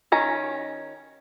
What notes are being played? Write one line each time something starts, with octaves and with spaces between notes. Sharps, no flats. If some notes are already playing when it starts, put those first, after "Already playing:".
D#3 C#4 A#5